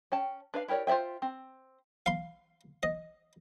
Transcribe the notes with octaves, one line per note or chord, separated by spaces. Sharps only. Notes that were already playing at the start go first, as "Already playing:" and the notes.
C#4 G5 A5
D4 B4 F5
E4 G4 A#4 C#5 D5
F4 C5 D5 E5 G5
C4
F5 C6
D#5